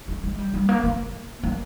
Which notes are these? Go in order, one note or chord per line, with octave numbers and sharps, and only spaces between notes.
A3
G#3
G3
G3
A#3
A#3
A#3